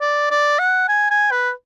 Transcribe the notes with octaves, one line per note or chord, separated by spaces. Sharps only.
D5
D5
F#5
G#5
G#5
B4